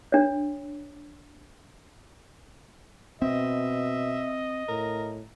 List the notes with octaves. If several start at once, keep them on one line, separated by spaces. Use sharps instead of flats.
D4 C#5
B2 C4 D#5 E5
A2 A#4